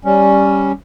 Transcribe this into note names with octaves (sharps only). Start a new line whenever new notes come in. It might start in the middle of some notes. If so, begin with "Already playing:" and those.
G3 C#4